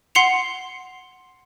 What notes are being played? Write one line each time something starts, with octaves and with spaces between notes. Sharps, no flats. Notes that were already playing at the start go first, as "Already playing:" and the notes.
F#5 C6 C7 C#7 F7